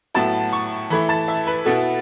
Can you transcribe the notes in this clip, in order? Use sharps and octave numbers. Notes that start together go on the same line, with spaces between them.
A2 F#3 B3 E4 A5
C#6
E3 A3 E4 B5
A5
E5
B4
B2 B3 E4 A4